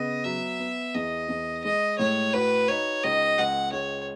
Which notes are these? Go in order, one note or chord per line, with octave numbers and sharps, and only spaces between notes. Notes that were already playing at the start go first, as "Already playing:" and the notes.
Already playing: C#3 B3 D#5
F#3 E5
B3
E2 D#5
E2
G#3 D#5
A2 C#5
F#4 B4
D#4 C#5
C#2 D#5
C#2 F#5
G#3 C#5